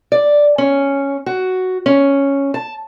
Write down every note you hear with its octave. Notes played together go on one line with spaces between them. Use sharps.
D5
C#4
F#4
C#4
A5